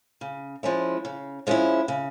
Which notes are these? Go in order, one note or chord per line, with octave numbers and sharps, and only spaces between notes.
C#3
F3 G#3 C#4 E4
C#3
F3 G#3 C#4 E4
C#3